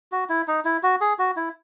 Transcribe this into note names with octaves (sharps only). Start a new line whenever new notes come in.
F#4
E4
D#4
E4
F#4
G#4
F#4
E4